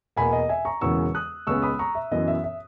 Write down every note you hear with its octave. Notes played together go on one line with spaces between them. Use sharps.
E2 B2 A#3 G#5 B5
D#5
E5 G#5
A#5 C#6
E1 E2 C#3 E3 A#3 C#6 E6
D#6 F#6
C#2 C#3 G#3 B3 C#6 E6
B5 D#6
A#5 C#6
E5
F#2 E3 B3 D#5
E5
E5